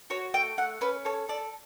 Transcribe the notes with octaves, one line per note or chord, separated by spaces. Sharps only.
F#4 C#5
A3 G5
A3 F#5
C#4 B4
A4 C#5
A4 D5